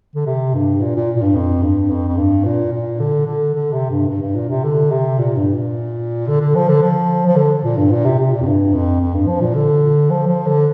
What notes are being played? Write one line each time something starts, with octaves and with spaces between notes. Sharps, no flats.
D3
C3
G2
A#2
A#2
A#2
G2
F2
G2
F2
F2
G2
A#2
A#2
D3
D3
D3
C3
G2
G2
G2
A#2
C3
D3
C3
A#2
G2
A#2
D3
D3
F3
D3
F3
F3
D3
A#2
G2
A#2
C3
C3
A#2
F2
G2
F2
F2
G2
F3
A#2
D3
F3
F3
D3